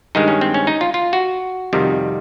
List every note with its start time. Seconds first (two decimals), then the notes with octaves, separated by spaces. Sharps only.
0.15 G2 D#3 G#3 D#4
0.28 C#4
0.41 C4
0.54 C#4
0.67 D#4
0.81 F4
0.94 F4
1.13 F#4
1.73 F2 C3 D#3 G3